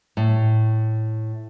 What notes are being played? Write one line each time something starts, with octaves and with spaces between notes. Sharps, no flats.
A2